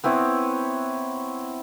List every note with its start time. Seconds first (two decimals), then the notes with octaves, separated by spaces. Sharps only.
0.04 B3 C4 E4 C#5